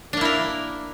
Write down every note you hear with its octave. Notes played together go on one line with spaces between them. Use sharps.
A#3 D4 E4 A#4